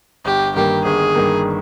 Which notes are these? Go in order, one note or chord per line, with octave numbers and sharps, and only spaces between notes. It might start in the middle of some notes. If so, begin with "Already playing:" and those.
G1 G4
G2 D#3 A#3 G4
G1 G#4
G2 D#3 A#3